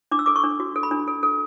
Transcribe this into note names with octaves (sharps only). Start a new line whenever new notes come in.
D4 D6
E6
A4 D6
C#6
D4
F#4
A4
B5
D4
A4
A4